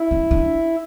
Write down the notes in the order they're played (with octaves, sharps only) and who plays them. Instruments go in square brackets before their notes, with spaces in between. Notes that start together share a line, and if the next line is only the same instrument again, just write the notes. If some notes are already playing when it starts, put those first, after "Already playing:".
Already playing: [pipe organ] E4
[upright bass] C#4
D4